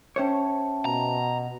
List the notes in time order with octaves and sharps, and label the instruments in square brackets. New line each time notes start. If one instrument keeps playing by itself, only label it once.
[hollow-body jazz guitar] C#4 C5 C#5 [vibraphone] E5 G5 A5
[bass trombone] B2 [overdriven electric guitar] A#5